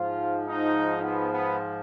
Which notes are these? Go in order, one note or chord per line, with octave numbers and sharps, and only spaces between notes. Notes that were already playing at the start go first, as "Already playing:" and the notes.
Already playing: G#2 F3 F4
D#4
B3
B3